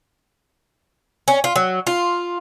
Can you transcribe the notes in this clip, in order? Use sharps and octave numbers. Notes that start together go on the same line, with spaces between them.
C#4
F4
F#3
F4